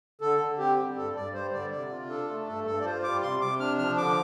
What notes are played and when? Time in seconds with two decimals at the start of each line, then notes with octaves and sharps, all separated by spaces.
0.21 D3 A4
0.40 D3
0.58 C4 G4
0.78 G3
0.96 G2 A4
1.16 G2 D5
1.33 G3 C5
1.53 D3 D5
1.71 C3 D5
1.91 F4
2.09 D4 A4
2.28 A3
2.47 G2 A4
2.66 G2 A4
2.81 D5
2.85 F4 C5
3.03 G3 D6
3.22 C3 C6
3.41 C3 D6
3.60 D4 F6
3.78 F3 F6
3.97 D3 D6